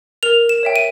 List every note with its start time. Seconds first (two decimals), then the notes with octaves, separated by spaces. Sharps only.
0.23 A#4 F7
0.49 E7
0.63 C#5 E5 G5
0.76 D#7